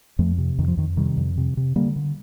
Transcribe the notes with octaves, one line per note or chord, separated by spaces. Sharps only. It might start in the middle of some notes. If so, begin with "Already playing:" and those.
F2 F3 A3
C3
F2 D#3
F3
F2 D#3
C3 D#3 G3
F2
C3
C3
D3 G3 A#3
D3